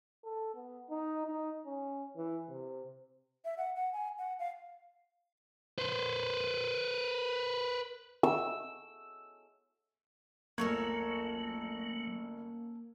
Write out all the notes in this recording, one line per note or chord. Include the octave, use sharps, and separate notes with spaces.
A4
B3
D#4
D#4
C#4
E3
C3
E5
F#5
F#5
G#5
F#5
F5
B4 C5
E6
G1 D2 F#3 A#3 C#4 A4 A#4 G#6